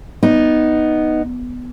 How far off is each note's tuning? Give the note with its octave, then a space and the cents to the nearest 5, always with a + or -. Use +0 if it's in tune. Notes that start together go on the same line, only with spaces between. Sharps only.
B3 +0 D#4 +0